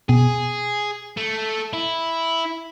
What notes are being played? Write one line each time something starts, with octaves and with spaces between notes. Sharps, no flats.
B2 G#4
A3
E4